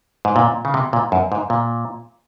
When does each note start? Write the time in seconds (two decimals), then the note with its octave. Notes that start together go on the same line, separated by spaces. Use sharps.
0.25 G#2
0.36 A#2
0.65 C#3
0.74 C3
0.93 A#2
1.12 F#2
1.32 G#2
1.50 A#2